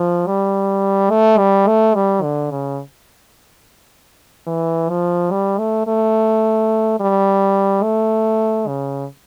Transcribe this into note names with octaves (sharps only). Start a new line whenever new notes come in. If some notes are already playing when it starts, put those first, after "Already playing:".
Already playing: F3
G3
A3
G3
A3
G3
D3
C#3
E3
F3
G3
A3
A3
G3
A3
C#3